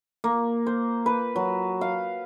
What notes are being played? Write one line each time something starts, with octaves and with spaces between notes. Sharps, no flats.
A#3
C5
B4
F#3
F5